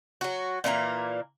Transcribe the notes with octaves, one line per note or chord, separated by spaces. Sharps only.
F#3 F#4
A#2 E3 A#3 A#5